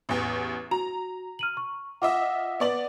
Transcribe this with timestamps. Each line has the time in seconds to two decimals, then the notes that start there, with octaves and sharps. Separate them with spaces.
0.09 A1 E2
0.71 F#4 A#5
1.39 F6 D#7 F#7
1.57 C#6
2.02 F4 D#5 E5 F#5 D6
2.60 B3 D5 F#7